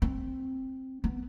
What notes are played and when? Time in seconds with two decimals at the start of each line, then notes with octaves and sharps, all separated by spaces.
0.02 C4
1.04 B3